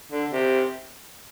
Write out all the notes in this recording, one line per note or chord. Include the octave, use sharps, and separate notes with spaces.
D3
C3